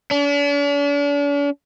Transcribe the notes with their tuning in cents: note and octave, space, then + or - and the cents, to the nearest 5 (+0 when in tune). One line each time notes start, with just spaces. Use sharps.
D4 -45